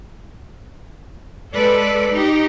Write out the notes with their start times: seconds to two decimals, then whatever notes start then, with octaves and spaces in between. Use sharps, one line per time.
1.54 G#3 A4 B4 D5
2.13 D#4 G4